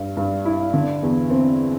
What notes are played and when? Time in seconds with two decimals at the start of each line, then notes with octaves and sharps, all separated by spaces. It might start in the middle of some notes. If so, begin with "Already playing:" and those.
Already playing: G2
0.17 G2
0.45 E4
0.73 D3
1.02 E2
1.30 C4